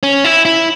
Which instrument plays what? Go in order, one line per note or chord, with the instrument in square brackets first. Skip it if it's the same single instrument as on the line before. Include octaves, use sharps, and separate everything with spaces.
[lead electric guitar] C#4
E4
E4